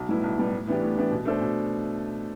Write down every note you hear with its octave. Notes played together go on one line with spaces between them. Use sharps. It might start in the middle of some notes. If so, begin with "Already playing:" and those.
Already playing: B1
A2 G3 B3 E4
B1
A2 G3 B3 E4
A2
E3 B3 D4 G4
A2
E3 B3 D4 G4
B2
A3 D4 A4 C5
B2